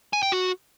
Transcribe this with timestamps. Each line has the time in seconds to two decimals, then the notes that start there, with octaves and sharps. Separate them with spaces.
0.13 G#5
0.23 G5
0.32 F#4